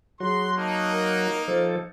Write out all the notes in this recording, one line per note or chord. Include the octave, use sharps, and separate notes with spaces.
F#3 F#4 G#4 C6
A#3 D#4 A5
A#4
F3 A4 C5